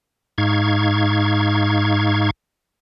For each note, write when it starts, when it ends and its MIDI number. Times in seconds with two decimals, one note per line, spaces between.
0.38 2.30 44
0.38 2.30 63
0.38 2.30 77
0.38 2.30 85
0.38 2.30 92